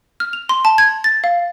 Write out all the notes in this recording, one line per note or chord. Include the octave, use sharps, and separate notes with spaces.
F6
F7
C6
A5
G#6
A6
F5